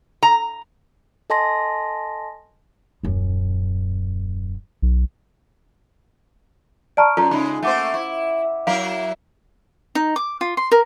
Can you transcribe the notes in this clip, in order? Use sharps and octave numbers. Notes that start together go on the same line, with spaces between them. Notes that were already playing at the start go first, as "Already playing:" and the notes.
A#5
A4 D#5 G#5 A5 C6 A#6
D#1 F#2
B1
D5 A5 A#5 C#6 F6 D7
F#2 F4 A4 A#5
C#3 G#3 D#4 B5
A3 A#3 C5 E5 F#5 D6
E4
F#3 E4 A#4 F5
D#4
D6
F4
C6
A#4